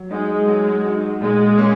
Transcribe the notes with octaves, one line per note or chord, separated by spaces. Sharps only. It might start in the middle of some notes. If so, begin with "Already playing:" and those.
Already playing: F#3
G#3 D#4 F#4
F#3
D#4 F#4
A#2 G#3
A#3 C#4